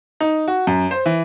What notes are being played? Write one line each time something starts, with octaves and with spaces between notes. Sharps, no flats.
D#4
F#4
F#2
C5
E3